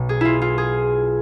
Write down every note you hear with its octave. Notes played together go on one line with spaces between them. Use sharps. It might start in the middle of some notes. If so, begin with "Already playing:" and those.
Already playing: B1 B2
G#4
E4 F4
F4
G#4